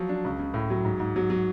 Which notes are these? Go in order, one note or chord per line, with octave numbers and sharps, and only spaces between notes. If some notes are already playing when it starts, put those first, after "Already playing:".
Already playing: F3 F#3
D4
C#2
C#3
A2
F#3
G#2
G#2
F#3
F#3